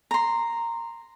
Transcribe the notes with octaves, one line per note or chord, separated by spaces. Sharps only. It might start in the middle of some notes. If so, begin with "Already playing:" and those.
A#5 C6